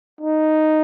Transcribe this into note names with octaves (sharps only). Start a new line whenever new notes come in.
D#4